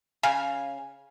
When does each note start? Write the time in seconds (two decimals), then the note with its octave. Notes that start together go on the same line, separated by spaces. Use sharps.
0.23 C#3 F5 G#5